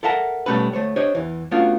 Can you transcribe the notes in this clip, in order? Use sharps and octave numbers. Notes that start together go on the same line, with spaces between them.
A4 A#4 E5 F#5 A5 A#5
B2 G3 A3 C#4 A4 B4
D2 A3 C5 C#5
D4 G4 C5 C#5 D#5
E2 E3
A3 B3 C#4 D4 F4 F#4